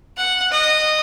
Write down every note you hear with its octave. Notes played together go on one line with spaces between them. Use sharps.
F#5
D#5